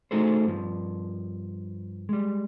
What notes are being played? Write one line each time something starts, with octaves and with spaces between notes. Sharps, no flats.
A3 D#4 F#4 G#4 A4 C5
G2 F3
G3 G#3